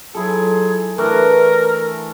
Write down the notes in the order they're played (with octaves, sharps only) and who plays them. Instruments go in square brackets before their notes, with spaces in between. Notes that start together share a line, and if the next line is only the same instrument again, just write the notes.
[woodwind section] F#3 F4 G#4 [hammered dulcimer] E4 A4
[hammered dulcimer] E3 A3 D4 [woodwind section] A#4